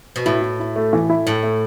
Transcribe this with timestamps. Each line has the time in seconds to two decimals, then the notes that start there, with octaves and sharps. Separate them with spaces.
0.16 B2
0.26 A2 E4
0.42 E4
0.60 E4
0.76 A3
0.93 E3
1.10 E4
1.26 A2 A3
1.43 A3